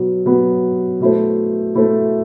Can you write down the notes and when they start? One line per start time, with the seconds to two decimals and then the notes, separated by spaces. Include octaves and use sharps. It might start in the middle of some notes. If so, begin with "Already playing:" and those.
Already playing: B2 F#3 B3
0.26 B2 F#3 B3
1.00 B2 A3 E4 A4 C5
1.75 B2 A3 E4 A4 C5